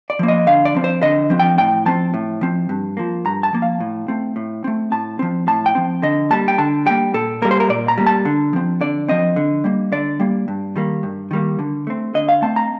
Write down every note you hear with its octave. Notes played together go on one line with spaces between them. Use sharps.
D5
F3 A#3
D#5
D3 F5
D5
F3 C4
C5
D3 D#5
F3 C4
G5
A2 G5
F3 C4 A5
A2
F3 C4
G2
F3 A#3
G2 A#5
A5
F3 A#3
F5
A2
A3 C4
A2
A3 C4
A2 A5
F3 C4
A2 A5
G5
F3 C4
D3 D#5
G3 A#3 A5
G5
D3 A5
G3 A#3 G5
A#2 A4
G3 A#3 A#4
C5
A#4
A#2 D5
A#5
G3 A#3
A5
D3
F3 C4
D3 D5
F3 C4 D#5
D3
G3 A#3
D3 D5
G3 A#3
G2
D#3 G3 A#3
G2
D#3 G3 A#3
D3
A3 C4
D3 D#5
F5
A3 C4 A5
A#5